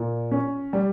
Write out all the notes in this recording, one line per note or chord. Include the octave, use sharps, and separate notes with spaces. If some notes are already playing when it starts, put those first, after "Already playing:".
Already playing: A#2
C#4
G3